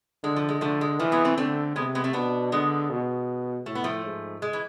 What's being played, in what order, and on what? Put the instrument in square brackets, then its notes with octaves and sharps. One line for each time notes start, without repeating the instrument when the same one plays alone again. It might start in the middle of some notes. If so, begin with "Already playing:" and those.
[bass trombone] D3 [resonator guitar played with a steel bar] G#3
[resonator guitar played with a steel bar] F3
G#3
[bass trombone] D3 [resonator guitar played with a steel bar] F3 A3
[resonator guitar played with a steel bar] G#3
[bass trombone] E3 [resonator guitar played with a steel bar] F3 A3
[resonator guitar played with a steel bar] G#3 B3
A3 C4
[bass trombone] D3 [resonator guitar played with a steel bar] A3 C4
[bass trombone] C3 [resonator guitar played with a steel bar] G#3 B3
[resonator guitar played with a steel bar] G#3 B3
A3 C4
[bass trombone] B2 [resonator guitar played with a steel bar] B3 D4
[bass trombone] D3 [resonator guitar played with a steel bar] G#3 B3
[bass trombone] B2
[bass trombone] A2 [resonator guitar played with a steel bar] A3
[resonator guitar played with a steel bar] B3
F3 A3
[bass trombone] G#2
[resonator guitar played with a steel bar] G#3
E3